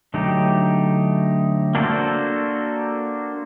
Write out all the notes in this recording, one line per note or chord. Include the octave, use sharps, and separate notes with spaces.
D3 F#3 A3 D#4 G4
A#3 D4 F#4 A4 C5